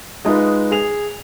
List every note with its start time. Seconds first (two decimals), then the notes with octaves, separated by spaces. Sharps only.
0.25 G#3 D#4 F4 B4
0.71 G#4 F7